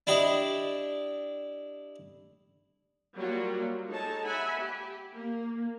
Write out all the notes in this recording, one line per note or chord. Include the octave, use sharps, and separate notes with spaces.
D4 E4 G4 D#5
F#3 G3 A#3 F4 F#4
G#3 D#4 A4 C#5 A5
E5 F#5 G#5 B5
G4
A#3